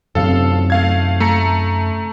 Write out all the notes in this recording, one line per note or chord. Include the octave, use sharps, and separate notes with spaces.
F#2 C3 C4 A4 F5
A3 F5 G#6
A3 A#5 C#7